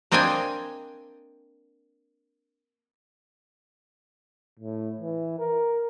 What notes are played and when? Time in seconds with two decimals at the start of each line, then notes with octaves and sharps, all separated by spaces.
0.12 A#3 C4 D4 D#5 G5 G#5
4.59 A2
5.01 E3
5.39 A#4